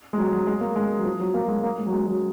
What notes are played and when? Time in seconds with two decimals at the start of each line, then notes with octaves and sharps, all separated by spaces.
0.13 G#3
0.18 F#3
0.32 F#3
0.47 G#3
0.61 A#3
0.76 G#3
0.99 F#3
1.05 F3
1.20 F#3
1.34 A#3
1.41 F#3
1.48 G#3
1.63 A#3
1.78 G#3
1.87 F#3
1.92 G#3
2.06 F#3